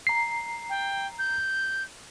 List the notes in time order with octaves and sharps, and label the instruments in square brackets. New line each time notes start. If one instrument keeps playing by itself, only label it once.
[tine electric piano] A#5 C7
[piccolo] G5
G6